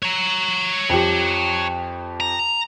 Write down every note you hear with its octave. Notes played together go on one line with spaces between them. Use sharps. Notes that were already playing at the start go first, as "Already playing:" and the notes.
C#5 A#5
F2 G4
A#5